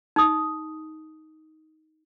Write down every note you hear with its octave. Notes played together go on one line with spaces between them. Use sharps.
D#4 D#6